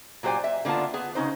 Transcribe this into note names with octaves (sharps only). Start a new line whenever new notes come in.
A#2 F#3 G4 C5 D5 G#5
E5
D3 A#3 B3 F4 A5
B3 G#4
C#3 C#4 D#4 C5